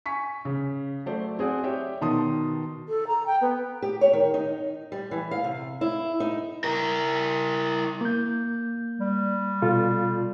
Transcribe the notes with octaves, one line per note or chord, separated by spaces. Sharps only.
G#5 C#6 B6
C#3
F#3 A3 C5 D5
C4 G#4 D5 F#5
G4 C#5 D5 E5 G5
B2 D#3 A5 C6 D#6
A4
A#5
G5
B3
G4
C#5
D#3
D#4
G3
E3
F5
C3
E4
D#4
E4 A#4
A#3 G6
G3
B2 F4 A4